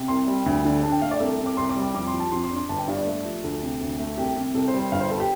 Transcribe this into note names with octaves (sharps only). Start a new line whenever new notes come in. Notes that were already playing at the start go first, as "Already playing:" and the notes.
Already playing: C3
C2 C6
G3
D2
D3
D4 A5
G5
A3 F5
D5
C2 A4
C3
D6
C2 C6
D6
G3
D6
F2 D6
C6
F3
A5
F2 C6
C6
D4
C6
G1 A5
G5
G2 F5
D5
A3
F3
D2 A4
C3
D2
A3
C2 G4
C3
C2 A4
C5
G3
C5
G1 F5
C5
A4
G4